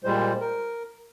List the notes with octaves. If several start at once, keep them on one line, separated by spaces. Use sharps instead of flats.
A#2 G3 G#3 C5
A#4